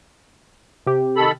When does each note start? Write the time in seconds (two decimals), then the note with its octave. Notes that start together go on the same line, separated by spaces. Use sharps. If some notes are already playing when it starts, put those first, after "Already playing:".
0.86 C3 G4
1.17 D#3 A4 B5